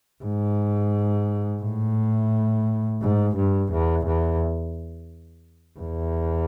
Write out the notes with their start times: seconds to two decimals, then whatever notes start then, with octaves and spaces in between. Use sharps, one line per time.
0.23 G#2
1.62 A2
3.02 G#2
3.36 G2
3.72 E2
4.06 E2
5.79 E2